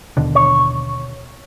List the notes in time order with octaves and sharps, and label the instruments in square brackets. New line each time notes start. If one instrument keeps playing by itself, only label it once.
[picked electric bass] D#2 B2 D3
[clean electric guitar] C#5